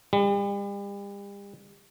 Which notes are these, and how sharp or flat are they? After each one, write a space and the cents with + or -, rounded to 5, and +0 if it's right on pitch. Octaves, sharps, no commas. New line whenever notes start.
G3 +40